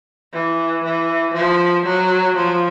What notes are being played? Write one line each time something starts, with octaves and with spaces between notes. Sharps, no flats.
E3
E3
F3
F#3
F3